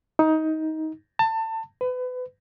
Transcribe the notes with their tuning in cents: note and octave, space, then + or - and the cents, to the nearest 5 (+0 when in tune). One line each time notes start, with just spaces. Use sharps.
D#4 +20
A5 +25
B4 +30